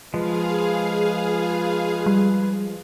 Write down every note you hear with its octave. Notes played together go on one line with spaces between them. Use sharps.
F3 G#3 F4 G#4 B4 F5
G3